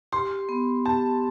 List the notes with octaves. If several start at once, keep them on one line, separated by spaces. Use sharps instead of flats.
G4 C6
B3
G4 A5